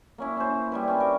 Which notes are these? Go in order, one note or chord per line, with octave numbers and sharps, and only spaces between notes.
A#3 C#4 E4
C#4 C5
G3 E4 B4
C#4 D4
A#4